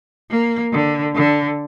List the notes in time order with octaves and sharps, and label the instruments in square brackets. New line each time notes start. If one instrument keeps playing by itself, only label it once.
[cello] A#3
D3
D3